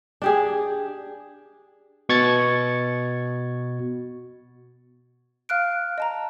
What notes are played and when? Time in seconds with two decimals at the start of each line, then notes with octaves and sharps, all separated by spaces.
0.22 D4 G4 G#4
2.09 B2 C#6 G#6 A6 C#7
5.49 F5 F6 F#6 D7
5.98 D#5 A5 A#5